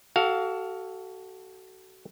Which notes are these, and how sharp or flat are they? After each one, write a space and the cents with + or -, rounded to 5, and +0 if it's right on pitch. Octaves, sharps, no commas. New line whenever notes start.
F#4 +30 A4 +0 F5 +10